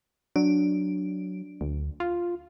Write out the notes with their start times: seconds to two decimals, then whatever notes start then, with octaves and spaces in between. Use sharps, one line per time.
0.36 F#3 D4
1.61 D2
2.00 F4